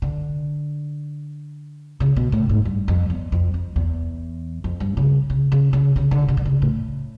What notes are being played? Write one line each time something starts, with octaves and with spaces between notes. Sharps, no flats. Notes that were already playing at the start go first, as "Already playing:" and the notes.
D3
C#3
B2
A2
G#2
G2
F2
E2
F2
F2
E2
F2
G2
C#3
C#3
C#3
C#3
C#3
D3
C#3
D3
C#3
A2